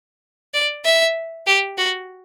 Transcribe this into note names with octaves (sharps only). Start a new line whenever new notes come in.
D5
E5
G4
F#4